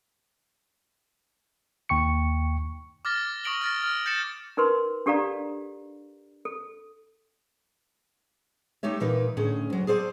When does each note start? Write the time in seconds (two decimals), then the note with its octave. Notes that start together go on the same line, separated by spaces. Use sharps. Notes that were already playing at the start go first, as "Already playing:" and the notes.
1.89 D#2 G5 C#6 C#7
3.05 D6 F6 A6 A#6 G7
3.44 C#6 D#6 A#6 D7 F#7 G7
3.62 F6 A6 A#6
3.83 F6
4.06 G6 A6 A#6 C#7 E7
4.57 D#4 A#4 B4 C6
5.06 D4 G4 A4 D5 F5 A#5
6.45 A4
8.83 A3 D#4 G4 C#5 E5
9.00 A#2 E3 D#4 A#4 B4
9.37 A2 D3 C#4 G#4
9.70 D2 F#3
9.87 G#4 A4 C5 D5